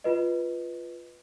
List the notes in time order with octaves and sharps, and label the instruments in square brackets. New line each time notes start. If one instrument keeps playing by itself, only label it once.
[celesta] F4 B4 D#5